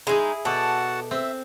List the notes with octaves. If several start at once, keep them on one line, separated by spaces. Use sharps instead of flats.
G#3 D#4 E4 G#4
B2 F#4 A4 D5 F#5 A5
C4 E5